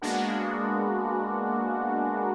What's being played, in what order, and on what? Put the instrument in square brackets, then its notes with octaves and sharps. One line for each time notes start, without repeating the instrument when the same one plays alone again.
[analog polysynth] G#3 A#3 B3 D4 F#4 A#4